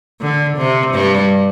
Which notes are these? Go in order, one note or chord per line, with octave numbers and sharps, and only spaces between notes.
D3
C3
G2 G3